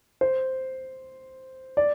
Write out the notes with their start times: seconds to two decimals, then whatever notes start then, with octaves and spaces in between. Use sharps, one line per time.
0.21 C5
1.77 D5